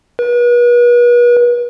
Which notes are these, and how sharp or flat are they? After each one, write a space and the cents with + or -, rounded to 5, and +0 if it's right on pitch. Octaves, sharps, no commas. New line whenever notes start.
B4 -40